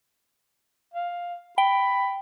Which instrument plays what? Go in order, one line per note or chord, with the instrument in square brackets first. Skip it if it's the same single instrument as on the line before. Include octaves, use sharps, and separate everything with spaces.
[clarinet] F5
[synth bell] G5 [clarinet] B5